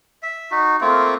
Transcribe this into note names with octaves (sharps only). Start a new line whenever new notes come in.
E5
D#4 F#4
A3 A#3 C4 F4